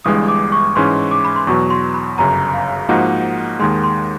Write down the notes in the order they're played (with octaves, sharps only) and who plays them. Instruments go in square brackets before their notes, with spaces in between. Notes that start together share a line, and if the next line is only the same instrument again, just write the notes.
[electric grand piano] G1 G2 E3 G#3 [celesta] D#6
[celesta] D6
C#6
[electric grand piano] G#2 E3 G#3 C#4 [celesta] C6
[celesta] D6
B5
C6
[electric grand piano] E2 B2 F#3 [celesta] C#6
[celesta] C6
B5
[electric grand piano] G1 F#2 C#3 [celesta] A#5
[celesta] F5
[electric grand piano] G#2 F3 A#3 D#4 F#4 [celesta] F#5
[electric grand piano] D#2 D#3 G#3 [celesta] C6
[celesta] C6